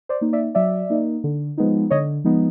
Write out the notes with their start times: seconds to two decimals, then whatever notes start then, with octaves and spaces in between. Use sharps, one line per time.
0.09 C5 D5
0.21 A#3 D#4
0.33 D5 E5
0.55 F#3 D5 E5
0.90 A#3 D#4
1.24 D3
1.58 F3 G#3 B3 D#4
1.90 D3 C#5 D#5
2.24 F3 G#3 B3 D#4